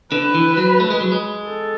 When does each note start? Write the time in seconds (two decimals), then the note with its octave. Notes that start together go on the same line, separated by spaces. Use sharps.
0.12 D3 B4
0.35 E3
0.57 F#3
0.80 A3
0.90 G#3
1.01 F#3
1.12 G#3
1.48 A4